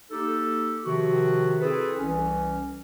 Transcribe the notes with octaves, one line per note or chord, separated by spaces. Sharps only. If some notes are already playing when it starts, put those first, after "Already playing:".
A#3 D#4 G4 A4
C3 D#3 F3 F#4
C4 E4 G#4 A4 B4
C2 E3 C#4